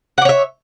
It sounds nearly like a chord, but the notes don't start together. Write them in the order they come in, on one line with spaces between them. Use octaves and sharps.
F#5 D5 C#5 E5